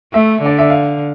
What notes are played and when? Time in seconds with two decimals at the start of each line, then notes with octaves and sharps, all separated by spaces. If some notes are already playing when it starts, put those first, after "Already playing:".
0.14 A3 E5
0.42 D3 D5
0.59 E5
0.70 F5